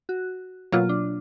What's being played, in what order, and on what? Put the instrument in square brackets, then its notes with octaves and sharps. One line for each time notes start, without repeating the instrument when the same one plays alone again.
[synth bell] F#4
[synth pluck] B2 F#3 A#3 [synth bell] F4
[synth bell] D4